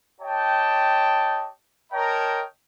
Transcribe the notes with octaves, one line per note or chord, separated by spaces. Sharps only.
G4 C#5 D#5 G5 A5
A#4 C#5 D#5 G5 A5 A#5